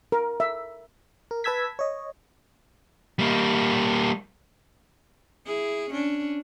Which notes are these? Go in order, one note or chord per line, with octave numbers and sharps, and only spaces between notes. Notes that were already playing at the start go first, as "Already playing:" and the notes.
A#4
E5
A#4
B4 A5 E6 G#6 B6
C#5 D#5
G3 A#3
E4 G#4
C#4 D4